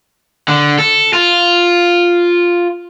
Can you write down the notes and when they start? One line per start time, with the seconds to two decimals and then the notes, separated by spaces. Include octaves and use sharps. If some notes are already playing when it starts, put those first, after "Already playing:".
0.48 D3
0.79 A4
1.13 F4